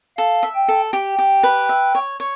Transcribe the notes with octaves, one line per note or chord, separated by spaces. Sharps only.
A4 F5
E5
G5
A4
G4 G5
G4
B4
E5
C#5
C#5